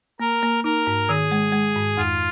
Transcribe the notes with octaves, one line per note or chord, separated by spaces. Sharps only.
A#3 A#4
A#3
D#4 A#4
G#2
D#3 G#4
G#3
G#3
G#2
F2 F4